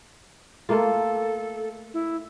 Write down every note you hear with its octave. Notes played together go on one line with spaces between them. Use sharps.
A3 A#3 F4 A4
E4